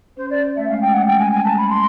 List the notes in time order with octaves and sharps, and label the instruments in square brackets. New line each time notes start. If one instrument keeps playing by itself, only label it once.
[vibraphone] C#4 [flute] C5
[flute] D5
[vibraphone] A3 [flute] E5
[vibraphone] G#3 [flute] F5
[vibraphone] G#3 [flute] G5
[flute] F#5
[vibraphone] G3 [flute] G5
[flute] G#5
G#5
A5
B5
C6